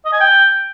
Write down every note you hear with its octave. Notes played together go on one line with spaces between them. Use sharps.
D#5
G#5
G5